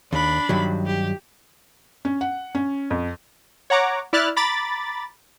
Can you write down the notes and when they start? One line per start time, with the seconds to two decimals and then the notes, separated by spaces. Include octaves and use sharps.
0.13 D#2 D4 B5
0.49 G2 D#3 F#3
0.86 G4
2.05 C#4
2.21 F#5
2.55 C#4
2.91 F2
3.70 C#5 F#5 A#5 D6
4.13 E4 D5 E5 F6 F#6 A6
4.36 A#5 B5 D6 A6